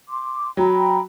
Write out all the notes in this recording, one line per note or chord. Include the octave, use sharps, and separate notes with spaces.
C6 D6
F#3 G5 A#5 B5